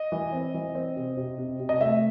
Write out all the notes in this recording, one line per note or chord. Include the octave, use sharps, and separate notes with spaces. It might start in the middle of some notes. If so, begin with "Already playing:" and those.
Already playing: D#5
E3
C4
E3
C4
C3
C3
C3
C3
D#5
A3 E5